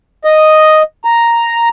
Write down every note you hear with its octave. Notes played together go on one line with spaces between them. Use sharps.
D#5
A#5